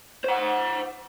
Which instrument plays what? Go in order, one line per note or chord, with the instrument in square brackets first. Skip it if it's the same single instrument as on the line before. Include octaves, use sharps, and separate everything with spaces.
[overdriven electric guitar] C5 F#5